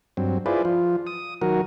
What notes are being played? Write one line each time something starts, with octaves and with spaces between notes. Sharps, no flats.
G2 F#3 C4
E4 F4 G#4 B4 C5 D5
F3 F4
D#6
D#3 F#3 F#4 A#4